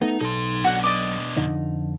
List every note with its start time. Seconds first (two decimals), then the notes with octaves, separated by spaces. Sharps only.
0.02 A3 B3 D#4
0.21 B1 D#4 A4 C6
0.64 B2 D4 F#4 F#5
0.84 D5 D#5 D6
1.37 F2 D3 D#4